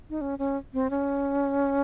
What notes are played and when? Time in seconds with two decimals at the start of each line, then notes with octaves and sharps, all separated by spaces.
0.10 D#4
0.21 C#4
0.39 C#4
0.73 C4
0.90 C#4